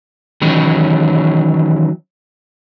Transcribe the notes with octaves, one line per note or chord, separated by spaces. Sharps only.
D#3 E3 F#3 C#4